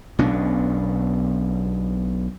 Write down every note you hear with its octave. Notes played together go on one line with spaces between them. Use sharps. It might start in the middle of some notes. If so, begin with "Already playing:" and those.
B1 B2 C#4 D4